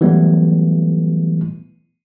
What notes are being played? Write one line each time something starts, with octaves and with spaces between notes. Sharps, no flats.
E3 F#3 G3 A3 B3